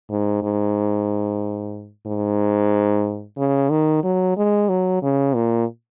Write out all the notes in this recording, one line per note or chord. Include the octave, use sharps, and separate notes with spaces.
G#2
G#2
G#2
C#3
D#3
F#3
G#3
F#3
C#3
A#2